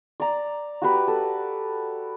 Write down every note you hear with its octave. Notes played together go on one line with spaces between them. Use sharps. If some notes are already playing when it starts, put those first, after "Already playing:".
D5 A#5
F#4 G4 B4
A4